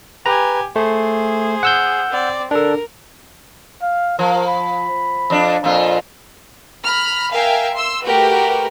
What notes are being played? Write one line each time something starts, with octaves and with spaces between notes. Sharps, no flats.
G4 B4 G#5 A#5
A3 G#4 C5
F#5 E6 G6
C4 D5
D4 A4 A#4
F5
F3 A#4
B5
F2 D4
F2 A#2 F4
A#5 B5 F6
A#4 E5 F5 G5 G#5
C6 E6
A3 F#4 G4 A#4 B4